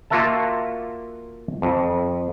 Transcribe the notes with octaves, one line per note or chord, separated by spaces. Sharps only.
A#3 F4 F#4 A#4 E5 A5
F2